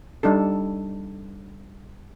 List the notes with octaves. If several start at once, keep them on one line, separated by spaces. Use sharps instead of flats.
G3 D4 D#4 A4